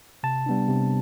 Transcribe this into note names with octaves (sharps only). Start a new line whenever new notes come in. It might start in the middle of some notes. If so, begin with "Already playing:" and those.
C3 A5
G3 B3 D4
C3